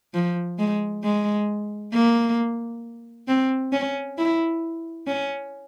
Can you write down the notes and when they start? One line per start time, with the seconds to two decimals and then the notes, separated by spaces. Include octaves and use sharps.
0.14 F3
0.59 G#3
1.03 G#3
1.93 A#3
3.28 C4
3.72 C#4
4.18 E4
5.07 C#4